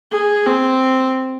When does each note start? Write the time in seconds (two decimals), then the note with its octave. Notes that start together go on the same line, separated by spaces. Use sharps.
0.12 G#4
0.46 C4